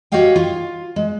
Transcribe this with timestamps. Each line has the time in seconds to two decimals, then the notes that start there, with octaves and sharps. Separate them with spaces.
0.12 F#4 G4 C#5 D#5 F5 G5
0.36 F4
0.96 G#3